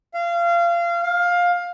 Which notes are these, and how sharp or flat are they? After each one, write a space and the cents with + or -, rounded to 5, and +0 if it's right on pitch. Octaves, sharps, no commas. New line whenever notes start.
F5 -25
F5 +15